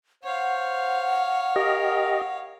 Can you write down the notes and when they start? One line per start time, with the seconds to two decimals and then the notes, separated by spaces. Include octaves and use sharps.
0.23 C5 C#5 F5 F#5
1.56 G4 A#4 D#5